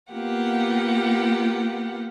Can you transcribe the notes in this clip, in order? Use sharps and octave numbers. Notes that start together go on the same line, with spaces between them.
A#3 B3 F4 G4 F#5